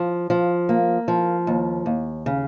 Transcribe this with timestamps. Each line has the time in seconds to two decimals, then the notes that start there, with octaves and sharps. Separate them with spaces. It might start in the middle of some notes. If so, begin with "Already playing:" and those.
Already playing: F3
0.30 F3
0.69 A#3
1.08 F3
1.47 D#2
1.86 D#2
2.26 C#3